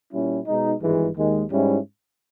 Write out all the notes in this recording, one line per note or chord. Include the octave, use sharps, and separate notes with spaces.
A#2 G3 C#4 E4
B2 G#3 D#4
G#1 G2 E3 G#3
D#2 D#3 G#3 D#4
G#2 G3 C#4 E4